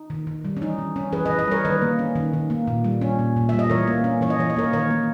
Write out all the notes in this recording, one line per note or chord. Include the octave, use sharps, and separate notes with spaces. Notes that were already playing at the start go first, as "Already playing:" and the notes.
Already playing: D#4
D#3
D#3
G3
C#4
E3 D#4
G3
C#4
E3 G#4 B4
B4 D#5
E3
B4 D#5
G3 A#4 C#5
D#3 B4 D#5
A#3
C#4
D#3
D#3
A#3
A#2
G3
C#4
A#2
A#2
G3 E5
D#5
E3 A#4 C#5
A#3
C#4
E3 C#5
D#5
E3 C#5
D#5
A#3 A#4 C#5
D#3 A#4 C#5
A#3